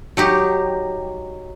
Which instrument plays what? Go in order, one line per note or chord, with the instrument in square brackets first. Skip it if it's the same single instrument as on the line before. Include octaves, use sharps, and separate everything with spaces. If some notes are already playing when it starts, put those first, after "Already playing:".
[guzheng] F#3 D#4 G4